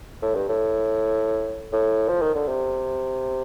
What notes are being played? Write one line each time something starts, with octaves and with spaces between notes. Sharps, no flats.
A2
G2
A2
A2
F3
D#3
D3
C3